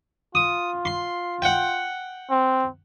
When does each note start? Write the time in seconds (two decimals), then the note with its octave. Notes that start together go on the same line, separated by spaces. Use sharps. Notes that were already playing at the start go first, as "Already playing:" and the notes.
0.35 F4 D#6
0.85 C6
1.42 F#5 G5
2.31 C4